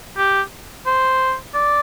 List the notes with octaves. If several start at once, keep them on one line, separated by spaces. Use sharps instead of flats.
G4
C5
D5